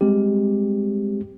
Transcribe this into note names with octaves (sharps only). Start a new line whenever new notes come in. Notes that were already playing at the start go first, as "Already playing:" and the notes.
G3 G#3 C4 G4